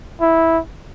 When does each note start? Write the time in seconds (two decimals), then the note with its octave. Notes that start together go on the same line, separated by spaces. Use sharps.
0.21 E4